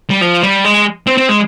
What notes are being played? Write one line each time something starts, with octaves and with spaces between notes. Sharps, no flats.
G3
F3
G3
G#3
C4
C4
G#3